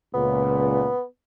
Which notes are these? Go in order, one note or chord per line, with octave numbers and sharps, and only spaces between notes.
C#2 A#2 B3